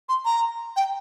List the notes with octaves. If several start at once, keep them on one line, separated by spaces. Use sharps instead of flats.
C6
A#5
G5